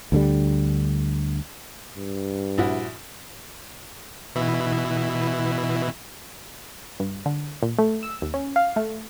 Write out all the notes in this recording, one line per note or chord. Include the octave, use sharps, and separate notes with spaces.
D2 D3 G3
G2
A#1 E4 F#4
B2 E3 E4
G2
D3
A#2
A3
E6
D#2
C#4
F5
A3